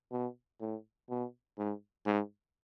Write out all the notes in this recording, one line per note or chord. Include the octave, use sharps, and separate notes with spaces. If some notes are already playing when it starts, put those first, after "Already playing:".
B2
A2
B2
G#2
G#2